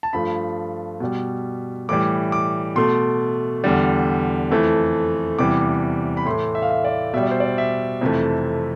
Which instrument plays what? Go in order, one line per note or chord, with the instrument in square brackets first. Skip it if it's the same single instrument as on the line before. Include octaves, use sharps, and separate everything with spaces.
[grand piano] A5
G2 F3 A3 B5
B2 G3
A2 E3 G3 D6
D6
B2 A3 C6
E2 D3 G3
F2 E3 A3
E2 C3 E3 G3 D6
B5
A2 E3 A3 C6
E5
F5
E5
D5
B2 G3 E5
D5
C5
D5
E5
F2 C3 E3 A3